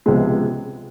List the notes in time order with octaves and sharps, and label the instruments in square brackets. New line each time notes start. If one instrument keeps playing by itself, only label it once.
[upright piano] C#2 C3 F3 G#3 B3